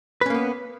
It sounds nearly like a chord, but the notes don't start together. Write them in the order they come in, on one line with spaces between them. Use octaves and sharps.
B4 C#4 A#3 B3